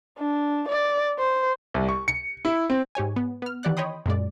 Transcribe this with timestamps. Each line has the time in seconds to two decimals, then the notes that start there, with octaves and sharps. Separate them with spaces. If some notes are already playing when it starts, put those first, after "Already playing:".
0.19 D4
0.69 D5
1.18 C5
1.74 C2
1.89 C#6
2.08 C#7
2.45 E4
2.70 C4
2.95 G#2 G4 C#5 G#5
3.16 B3
3.42 B3 F6
3.63 D#3 E3 G4 D5 F#5 F#6
3.77 C#5 D#5 G5 B5 C6 D#6
4.06 F#2 A#2 G#3 D5